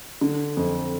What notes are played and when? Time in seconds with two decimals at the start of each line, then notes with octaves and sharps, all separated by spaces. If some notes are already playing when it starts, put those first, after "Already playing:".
0.21 D3
0.57 F2